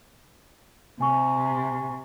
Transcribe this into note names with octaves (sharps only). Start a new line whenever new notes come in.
C3 G#5 C#6